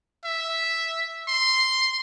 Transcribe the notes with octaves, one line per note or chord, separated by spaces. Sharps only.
E5
C6